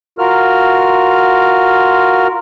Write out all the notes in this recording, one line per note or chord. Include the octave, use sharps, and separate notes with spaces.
F4 F#4 A#4 F6